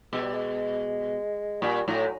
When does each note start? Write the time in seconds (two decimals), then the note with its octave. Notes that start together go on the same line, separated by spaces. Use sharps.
0.13 B2 G#3
0.24 G3
0.34 G#3
1.62 A#2 G3
1.87 A2 F#3